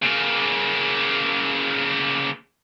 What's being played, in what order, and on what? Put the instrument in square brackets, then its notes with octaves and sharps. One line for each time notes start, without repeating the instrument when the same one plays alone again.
[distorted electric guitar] C#3 A#3